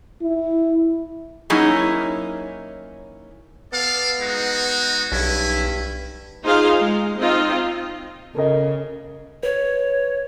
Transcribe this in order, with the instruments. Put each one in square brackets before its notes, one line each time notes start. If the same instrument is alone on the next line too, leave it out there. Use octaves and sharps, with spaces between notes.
[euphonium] E4
[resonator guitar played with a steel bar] F#3 A#3 C#4 D#4 E4 G#4
[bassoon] B3 [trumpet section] A4 D5 F5
[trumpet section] G#3 D#4 F#4
[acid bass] B1 [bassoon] G2 [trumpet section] C#4 E4
[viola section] D#4 F4 G#4 C5 F5
G#3
C4 D#4 F4 D#5
[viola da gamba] C#3 [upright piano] A4 A#4 D#5
[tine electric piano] B4 [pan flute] C#5